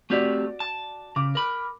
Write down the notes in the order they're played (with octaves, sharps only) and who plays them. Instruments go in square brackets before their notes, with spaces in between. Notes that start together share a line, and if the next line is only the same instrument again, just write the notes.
[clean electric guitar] A3 C4 G4 [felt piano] F#4 D5
[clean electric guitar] A5
[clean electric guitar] C#3 [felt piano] D6
[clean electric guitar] A#4 B5